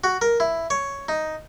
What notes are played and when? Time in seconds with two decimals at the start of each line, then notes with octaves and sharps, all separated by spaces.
0.04 F#4
0.22 A#4
0.40 E4
0.70 C#5
1.08 D#4